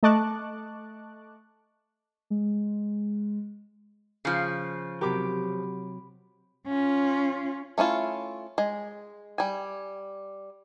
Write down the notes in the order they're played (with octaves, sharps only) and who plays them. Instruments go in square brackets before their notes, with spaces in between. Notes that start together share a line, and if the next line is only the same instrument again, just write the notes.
[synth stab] A3 D#5 A5 C#6 D6 F#6
[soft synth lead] G#3
[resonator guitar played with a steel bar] C#3 F3
[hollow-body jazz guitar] C3 F#3 A#4 [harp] G4 B5 D6
[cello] C#4 F4
[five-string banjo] A3 C#4 E4 F4
G#3
G3 G#5